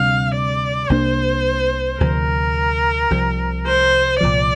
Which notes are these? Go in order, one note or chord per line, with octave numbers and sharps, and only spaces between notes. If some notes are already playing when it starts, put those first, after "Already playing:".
Already playing: D2 C3 G3 D4 F5
D5
C2 C3 A#3 D4 C5
D2 C3 F3 A#4
C2 C3 F3
C5
C2 A#2 F3 D5